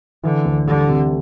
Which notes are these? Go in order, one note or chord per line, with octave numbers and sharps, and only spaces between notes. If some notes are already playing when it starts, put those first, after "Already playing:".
D3 E3
D2
D3 G3
C3